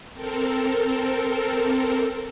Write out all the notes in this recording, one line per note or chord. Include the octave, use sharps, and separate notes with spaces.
C4 A4 A#4